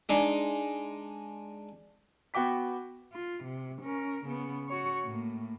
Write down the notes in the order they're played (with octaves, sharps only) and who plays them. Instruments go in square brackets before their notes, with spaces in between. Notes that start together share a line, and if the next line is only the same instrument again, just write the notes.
[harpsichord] G#3 D4 D#4
[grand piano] B3 F#4 G5 D6 B6
[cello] F4
C3
C#4 A#4
C#3 B3
F#4 C#5
A2 A#3